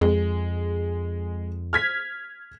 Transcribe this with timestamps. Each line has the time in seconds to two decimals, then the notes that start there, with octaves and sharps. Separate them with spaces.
0.01 F2 G#3
1.73 F6 G#6 B6